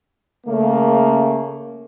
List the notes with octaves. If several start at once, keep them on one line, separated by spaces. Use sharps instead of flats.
C#3 A3 A#3